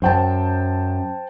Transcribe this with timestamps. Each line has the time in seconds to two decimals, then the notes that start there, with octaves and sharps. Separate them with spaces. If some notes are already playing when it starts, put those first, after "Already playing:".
0.02 F#2 C5 G5 A5